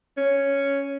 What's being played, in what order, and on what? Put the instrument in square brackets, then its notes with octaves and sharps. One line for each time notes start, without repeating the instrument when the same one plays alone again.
[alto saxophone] C#4